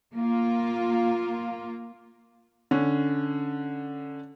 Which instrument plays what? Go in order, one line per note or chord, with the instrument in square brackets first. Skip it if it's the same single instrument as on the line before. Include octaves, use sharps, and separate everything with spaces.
[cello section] A#3 F4
[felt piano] D3 C#4